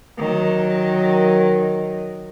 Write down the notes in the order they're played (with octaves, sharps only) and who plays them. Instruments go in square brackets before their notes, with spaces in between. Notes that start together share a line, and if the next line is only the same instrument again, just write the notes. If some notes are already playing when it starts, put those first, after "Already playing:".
[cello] D#3 F#3